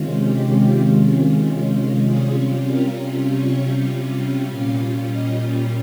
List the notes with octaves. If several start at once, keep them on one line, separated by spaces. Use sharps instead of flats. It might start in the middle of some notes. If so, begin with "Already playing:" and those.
Already playing: C3 D#3 G#3 C#4 F4
G4
C3 G3 C#4 F4 G#4
A#4
C#5
A#2 G3 C#4 F4 F5
D#5